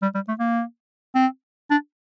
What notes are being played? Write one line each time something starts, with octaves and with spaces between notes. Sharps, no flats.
G3
G3
A3
A#3
C4
D4